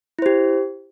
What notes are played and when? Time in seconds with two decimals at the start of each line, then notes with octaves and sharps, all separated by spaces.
0.19 E4
0.22 C5
0.26 G4